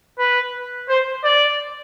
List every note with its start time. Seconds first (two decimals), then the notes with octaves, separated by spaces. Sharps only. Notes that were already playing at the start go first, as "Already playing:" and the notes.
0.19 B4
0.89 C5
1.24 D5